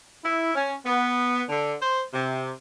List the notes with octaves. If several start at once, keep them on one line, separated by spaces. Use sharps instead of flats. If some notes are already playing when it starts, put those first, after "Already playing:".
E4
C#4
B3
D3
C5
C3